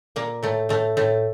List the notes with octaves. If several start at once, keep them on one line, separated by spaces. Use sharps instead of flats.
A#2 A#3
A2 A3
A2 A3
A2 A3